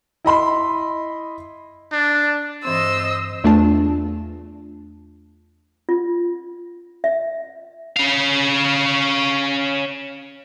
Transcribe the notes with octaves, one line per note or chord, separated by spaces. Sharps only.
E4 D#5 B5 C6
D4
G2 E3 C4 C5 D#5 E6
E2 A3 D4 F4 A5
F4
E5
C#4 F5